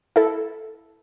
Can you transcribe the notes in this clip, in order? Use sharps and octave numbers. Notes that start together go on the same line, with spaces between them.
E4 A4